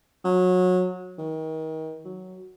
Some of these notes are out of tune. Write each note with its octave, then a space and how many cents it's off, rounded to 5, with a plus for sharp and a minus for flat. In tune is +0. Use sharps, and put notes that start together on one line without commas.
F#3 -25
D#3 +30
F#3 +0